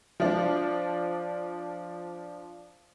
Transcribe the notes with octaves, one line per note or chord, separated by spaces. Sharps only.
F3 D4